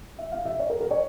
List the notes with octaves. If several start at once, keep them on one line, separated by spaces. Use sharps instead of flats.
E5
F5
E5
C#5
A#4
A#4
C#5